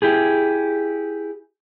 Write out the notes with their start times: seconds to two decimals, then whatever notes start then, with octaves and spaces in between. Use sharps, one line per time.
0.02 E4 G4 G#4